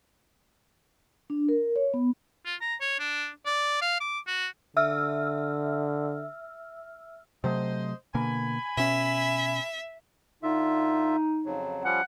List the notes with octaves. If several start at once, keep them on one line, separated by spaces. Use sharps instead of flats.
D4
A#4
C#5
B3
F4
A#5
C#5
D4
D5
F5
D6
F#4
D3 E5 E6 F6
C3 F#3 A3 C5 D#5
B2 D3 A#3 G#5 B5
B2 C#4 E5
D3 D#4 F4 E5
F2 C#3 F#3
F3 G3 C#4 F#5